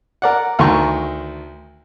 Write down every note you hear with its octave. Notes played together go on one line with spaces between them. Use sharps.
A#4 D5 F#5
D2 D#3 A#5 C#6